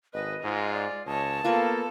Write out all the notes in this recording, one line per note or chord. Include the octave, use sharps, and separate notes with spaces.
G#1 B4 D#5
G#2 G#3 F4
D5
C#2 C#5 D#5 A5
A#3 B3 F4 A4 B4 C#6